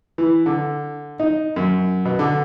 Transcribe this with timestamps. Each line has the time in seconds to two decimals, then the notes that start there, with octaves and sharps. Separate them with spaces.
0.18 E3
0.46 D3
1.20 D#4
1.56 F#2
2.05 B2
2.19 D3